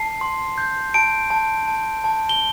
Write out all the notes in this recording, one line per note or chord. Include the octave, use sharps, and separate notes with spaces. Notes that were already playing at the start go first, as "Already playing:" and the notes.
Already playing: A5 C7
C6
G6
A5 D7
A5
A5
A5
G7